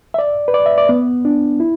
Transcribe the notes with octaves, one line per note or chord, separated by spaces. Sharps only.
E5
D5
B4
D5
E5
D5
B3
D4
E4